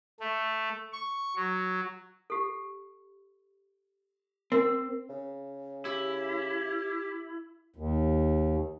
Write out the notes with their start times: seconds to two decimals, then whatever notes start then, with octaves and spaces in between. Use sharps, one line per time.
0.20 A3
0.93 C#6
1.36 F#3
2.30 G4 A4
4.52 C4 A#4
5.10 C#3
5.85 E4 G4
7.76 D#2